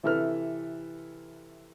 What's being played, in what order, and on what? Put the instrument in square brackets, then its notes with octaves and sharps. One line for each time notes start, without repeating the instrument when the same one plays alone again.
[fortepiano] C3 E3 E4 A4 B4 F6